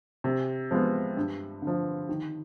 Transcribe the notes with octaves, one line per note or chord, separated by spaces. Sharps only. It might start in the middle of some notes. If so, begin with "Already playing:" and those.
C3
F3 G#3 B3
G2
D3
F3
D#3